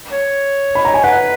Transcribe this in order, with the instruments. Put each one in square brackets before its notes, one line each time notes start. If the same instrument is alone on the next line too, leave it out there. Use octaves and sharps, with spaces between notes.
[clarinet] C#5
[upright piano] B5
A#5
G#5
[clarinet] B4 [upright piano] F#5